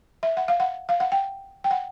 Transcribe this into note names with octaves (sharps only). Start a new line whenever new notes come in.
E5
F#5
F5
F#5
F5
F#5
G5
G5
F#5